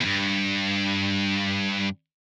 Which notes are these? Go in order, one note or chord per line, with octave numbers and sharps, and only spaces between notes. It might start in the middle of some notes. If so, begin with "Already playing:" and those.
E2 G2